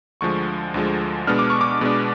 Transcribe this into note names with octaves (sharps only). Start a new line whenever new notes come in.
D2 D3 F3 G#3 C#6
D2 D3 F3 G#3
B2 G#3 B3 D4 F6
D6
C#6
D6
B2 G#3 B3 D4